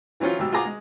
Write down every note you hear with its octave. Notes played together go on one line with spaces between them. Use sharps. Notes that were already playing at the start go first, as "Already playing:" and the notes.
E3 F#3 C4 C#4 F4
G#2 B2 F#3 G4 E6
F4 F#4 G#4 A#5 D6
G#3